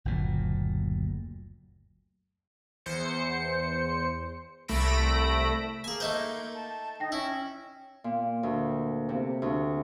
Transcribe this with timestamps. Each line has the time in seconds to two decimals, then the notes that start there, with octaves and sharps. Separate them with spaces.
0.05 F#1 D2 A#2
2.86 E2 C5 C#7
4.68 C2 A3 B5 E6 A#6 D7
5.84 A#3 G#4 G#5
6.00 A3 D#4 C5
6.55 A5
7.00 D#4 G5 A#6
7.12 C#4 E4
8.04 A#2
8.43 D2
9.09 C3
9.42 D2